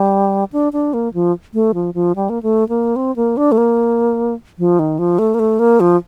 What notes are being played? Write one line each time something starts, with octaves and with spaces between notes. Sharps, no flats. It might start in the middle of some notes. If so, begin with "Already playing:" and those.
Already playing: G3
D4
D4
A#3
F3
A3
F3
F3
G3
A#3
A3
A#3
C4
A#3
D4
A3
A#3
F3
D#3
F3
A3
A#3
A3
A#3
F3